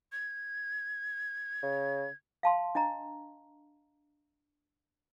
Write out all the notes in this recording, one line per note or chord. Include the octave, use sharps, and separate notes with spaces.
G#6
C#3
F5 A5 C6
D4 D#5 A#5